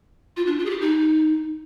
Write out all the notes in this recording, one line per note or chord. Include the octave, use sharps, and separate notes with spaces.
F4
D4
F4
G#4
G4
D#4